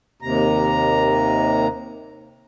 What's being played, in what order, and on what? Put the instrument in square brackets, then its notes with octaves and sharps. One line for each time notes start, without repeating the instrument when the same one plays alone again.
[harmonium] D#2 C3 A#5